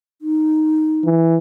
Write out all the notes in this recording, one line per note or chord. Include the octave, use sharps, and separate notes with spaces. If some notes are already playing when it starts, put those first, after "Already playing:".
D#4
E3